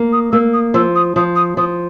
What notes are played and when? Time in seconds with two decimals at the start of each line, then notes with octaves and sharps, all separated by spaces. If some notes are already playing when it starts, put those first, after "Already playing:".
Already playing: A#3
0.13 D#6
0.32 A#3 E6
0.53 D#6
0.74 F3 E6
0.96 D#6
1.16 F3 D#6
1.36 D#6
1.57 F3 D#6